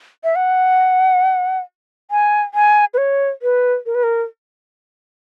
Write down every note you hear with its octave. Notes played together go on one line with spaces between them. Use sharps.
E5
F#5
G#5
G#5
B4
C#5
B4
A#4
B4
A#4